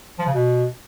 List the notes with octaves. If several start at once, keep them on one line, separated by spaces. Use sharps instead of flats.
F3
C#3
B2